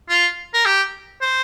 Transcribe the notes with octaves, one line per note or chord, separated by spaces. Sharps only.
F4
A#4
G4
C5